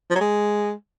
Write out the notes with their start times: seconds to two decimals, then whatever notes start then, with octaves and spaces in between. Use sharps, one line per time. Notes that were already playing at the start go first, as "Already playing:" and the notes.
0.10 F3
0.15 F#3
0.20 G#3